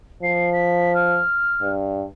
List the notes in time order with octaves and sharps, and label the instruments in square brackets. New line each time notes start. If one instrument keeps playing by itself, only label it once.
[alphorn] F3 [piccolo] C7
[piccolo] B6
F6
[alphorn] G2